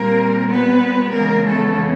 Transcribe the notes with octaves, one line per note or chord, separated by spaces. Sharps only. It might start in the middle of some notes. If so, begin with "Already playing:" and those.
Already playing: A#2 G3 A#3 C4 A#4
B3 B4
F2 C#3 E3 G#3 A#3 B3 A#4
A3 A4